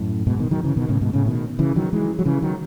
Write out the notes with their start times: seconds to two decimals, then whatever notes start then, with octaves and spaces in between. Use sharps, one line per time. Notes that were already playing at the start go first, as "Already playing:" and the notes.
Already playing: F#2 A2
0.27 G#2 B2
0.39 B2 D#3
0.51 D#3 F#3
0.64 C#3 E3
0.77 B2 D#3
0.89 A2 C#3
1.01 G#2 B2
1.13 A2 C#3
1.26 B2 D#3
1.59 C#3 E3
1.76 D#3 F#3
1.93 E3 G#3
2.19 F#3
2.25 C#3 E3
2.42 D#3 F#3